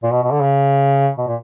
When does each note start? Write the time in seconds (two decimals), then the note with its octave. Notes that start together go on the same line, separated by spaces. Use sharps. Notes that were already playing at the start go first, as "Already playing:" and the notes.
0.03 A#2
0.12 B2
0.23 B2
0.32 D3
0.41 C#3
1.18 B2
1.27 A#2